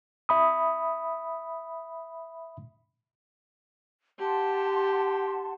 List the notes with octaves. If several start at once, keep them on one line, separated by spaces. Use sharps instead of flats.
E5 B5 D#6
G4 F#5 A5 C6